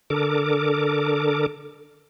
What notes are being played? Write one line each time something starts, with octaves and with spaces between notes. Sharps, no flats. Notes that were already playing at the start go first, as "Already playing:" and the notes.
D3 A4 A#4 D6